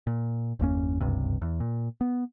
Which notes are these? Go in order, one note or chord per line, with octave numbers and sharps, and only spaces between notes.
A#2
G1 E2 A#3 C#4
F#1 C#2 G2 C3
E2
A#2
B3